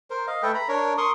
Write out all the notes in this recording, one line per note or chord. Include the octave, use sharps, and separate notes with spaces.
A#4 C5
D#5 F5
A3 A4 B4 G5
A#5 B5
D4 A#4 C#5
A#4 C6 C#6 D#6